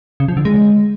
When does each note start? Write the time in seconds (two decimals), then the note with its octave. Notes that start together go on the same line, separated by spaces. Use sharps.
0.20 C#3
0.28 F3
0.37 D3
0.45 G#3